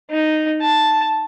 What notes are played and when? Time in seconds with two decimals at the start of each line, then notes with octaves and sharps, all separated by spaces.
0.10 D#4
0.61 A5